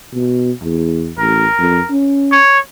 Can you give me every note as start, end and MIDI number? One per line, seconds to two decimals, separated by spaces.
0.14 0.52 47
0.62 1.12 40
1.19 1.46 33
1.19 1.91 70
1.58 1.79 41
1.90 2.38 61
2.32 2.59 73